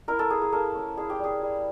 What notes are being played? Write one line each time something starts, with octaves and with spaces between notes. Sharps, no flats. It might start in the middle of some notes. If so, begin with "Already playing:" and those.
E4 A#4
A4
A#3 G#4
G#4
A#3 A4
C#4
E4 G#4
G4
G3 G#4
G3